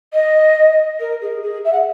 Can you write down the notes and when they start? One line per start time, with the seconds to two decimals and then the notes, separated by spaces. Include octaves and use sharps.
0.13 D#5
1.00 A#4
1.21 G#4
1.43 G#4
1.65 E5
1.72 F#5